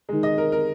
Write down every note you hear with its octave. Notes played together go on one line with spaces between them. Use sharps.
D#3 G#3
D#5
A#4
A#4